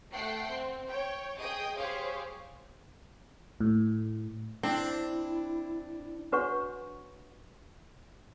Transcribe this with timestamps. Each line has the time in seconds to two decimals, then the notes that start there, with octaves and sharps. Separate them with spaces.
0.13 A3 F#5 G5 C7
0.50 C4
0.88 C#5 G5
1.37 G#4 D#5 G5 D#6
1.76 G4 G#4 C5 C#5 F5
3.61 A2
4.63 C4 D4 E4
6.32 D4 F#4 B4 C#5 F#5 C#6